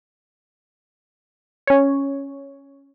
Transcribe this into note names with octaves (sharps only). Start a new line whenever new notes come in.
C#4 C#5